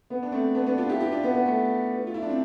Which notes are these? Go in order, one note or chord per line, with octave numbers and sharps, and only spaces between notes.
B3
D4
A3 C4
B3 D4
B3 D4
D4 F4
E4 G4
E4 G4
D4 F4
B3
B3
A3
F4
E4
D4
C4